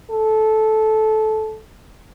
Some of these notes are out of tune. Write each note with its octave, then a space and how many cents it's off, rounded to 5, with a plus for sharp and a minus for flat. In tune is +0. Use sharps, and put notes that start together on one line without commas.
A4 -15